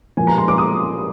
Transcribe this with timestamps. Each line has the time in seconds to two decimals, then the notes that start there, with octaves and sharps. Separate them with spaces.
0.17 A#2 F3 G#5
0.27 A#5
0.38 C6
0.48 D6
0.58 D#6